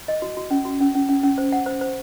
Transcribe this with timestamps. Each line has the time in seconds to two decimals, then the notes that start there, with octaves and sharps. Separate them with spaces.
0.08 D#5
0.22 F#4
0.37 F#4
0.51 C#4
0.65 F#4
0.80 C#4
0.95 C#4
1.09 C#4
1.24 C#4
1.38 C5
1.52 F#5
1.66 C5
1.81 C5